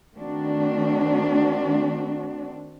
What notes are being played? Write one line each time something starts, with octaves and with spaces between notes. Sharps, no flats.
D#3 A3 C4 D4 F#4